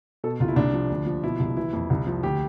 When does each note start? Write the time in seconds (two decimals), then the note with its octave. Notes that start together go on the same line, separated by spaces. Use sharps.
0.24 B2 A4
0.40 C2 F4
0.48 E4
0.56 C2 D4
0.74 F3
0.90 D2
1.06 F3
1.23 B2 E4
1.40 C2
1.57 E3 E4
1.73 F2
1.90 C2
2.07 F3
2.23 D2 G4